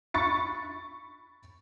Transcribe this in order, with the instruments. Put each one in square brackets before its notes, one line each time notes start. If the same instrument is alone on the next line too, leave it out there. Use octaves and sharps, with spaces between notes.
[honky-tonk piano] B5 C#6 A6 C#7